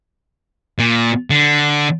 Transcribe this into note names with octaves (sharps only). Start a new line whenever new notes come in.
A#2
D3